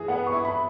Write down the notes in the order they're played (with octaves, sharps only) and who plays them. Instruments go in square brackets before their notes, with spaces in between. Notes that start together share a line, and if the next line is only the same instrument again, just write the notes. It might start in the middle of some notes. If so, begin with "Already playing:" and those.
Already playing: [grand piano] E3 G#4
[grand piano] B3 [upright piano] F#5
[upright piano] C#6
[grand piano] E4
[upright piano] B5